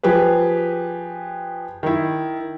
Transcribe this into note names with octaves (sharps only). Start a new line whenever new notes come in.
F3 G4 G#4 B4
D#3 E4